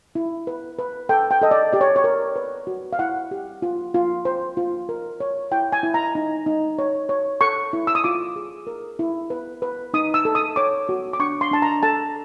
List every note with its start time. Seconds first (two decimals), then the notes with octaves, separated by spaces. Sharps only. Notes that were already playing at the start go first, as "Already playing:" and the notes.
0.15 E4
0.47 B4
0.79 B4
1.09 A4 G5
1.31 G5
1.42 A4 D#5
1.51 D5
1.73 G4 D5
1.81 C#5
1.96 C#5
2.04 A#4
2.36 B4
2.67 F#4
2.93 F5
2.99 E4 F#5
3.31 G4
3.62 F4
3.94 F4
4.25 C5
4.57 F4
4.89 A#4
5.20 C#5
5.51 E4 G5
5.72 G#5
5.83 E4
5.94 A#5
6.15 D#4
6.46 D#4
6.79 C#5
7.09 C#5
7.41 A4 C#6
7.73 E4
7.87 E6
7.95 D#6
8.04 F4 D6
8.36 G#4
8.67 A#4
8.99 E4
9.30 B4
9.62 B4
9.94 D#4 D#6
10.14 E6
10.25 A4
10.35 D#6
10.56 C#5 D6
10.89 F#4
11.13 D6
11.20 D4 C#6
11.41 C6
11.51 D4 A5
11.62 A#5
11.83 A4 A5